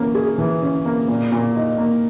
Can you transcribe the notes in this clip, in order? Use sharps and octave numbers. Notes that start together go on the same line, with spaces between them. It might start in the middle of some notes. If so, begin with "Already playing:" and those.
Already playing: E3 A#3 C#4
G#4
E3
C#4
A#3
A#2
A#2
D#4
A#3